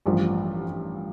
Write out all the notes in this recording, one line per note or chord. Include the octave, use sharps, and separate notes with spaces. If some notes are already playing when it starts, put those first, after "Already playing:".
A1 G2 F3